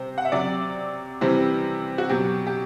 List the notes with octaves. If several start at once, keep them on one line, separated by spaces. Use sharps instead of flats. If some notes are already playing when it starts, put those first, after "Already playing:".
Already playing: C3 G3 C5
F#5
E5
C3 F#3 D5
C3 E3 G3 C5
F#4
B2 F#3 G4
G4